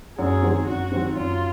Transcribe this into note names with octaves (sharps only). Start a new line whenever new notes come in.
F#2 G#4
D#3 F#3 C4
F#2 F#4
D#3 F#3 C4
F#2 F4